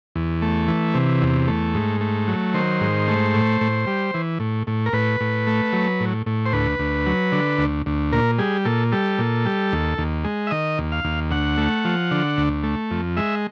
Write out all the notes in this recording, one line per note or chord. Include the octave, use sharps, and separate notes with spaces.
E2
A3
E3
C3
E2
A3
G#2
A3
F#3
D#3 C5
G#2
A3
A2
A2
G3
E3
A2
A2
A#4
A2 B4
A2
A3
F#3
A2
A2
C5
D2 B4
D2
F#3
D3
D2
D2
A#2 A#4
G3 G#4
A#2 A4
G3 A4
A#2
G3
D#2
D#2
G#3
E5
D#3 D#5
D#2
F5
D#2
D2 F#5
A3
F3
D3
D2
A3
F2
G#3 E5